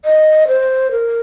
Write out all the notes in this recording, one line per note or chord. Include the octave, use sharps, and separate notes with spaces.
D#5
C5
A#4